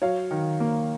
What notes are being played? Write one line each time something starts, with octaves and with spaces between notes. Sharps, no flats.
F#3 C#5 F5
D#3
A#3